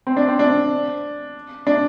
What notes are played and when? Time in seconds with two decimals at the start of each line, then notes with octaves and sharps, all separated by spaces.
0.07 C4
0.17 D4
0.28 C4
0.39 D4
1.67 D4